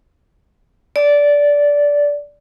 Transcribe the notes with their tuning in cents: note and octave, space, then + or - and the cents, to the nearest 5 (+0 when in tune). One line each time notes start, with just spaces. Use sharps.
D5 -15